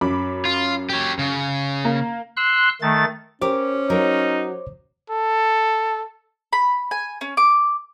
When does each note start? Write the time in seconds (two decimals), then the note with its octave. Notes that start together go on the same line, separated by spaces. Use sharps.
0.01 F#2 B5 D6
0.45 F4
0.90 G4 C#5
1.19 C#3
1.85 A#3
2.37 C6 E6 F#6
2.82 D#3 A3 A6
3.42 C#4 G4 A#4 C5 C#5 D6
3.90 F#3 D#4 A#4
5.10 A4
6.53 B5
6.91 G#5
7.21 C#4
7.37 D6